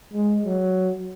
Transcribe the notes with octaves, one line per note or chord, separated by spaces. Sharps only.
G#3
F#3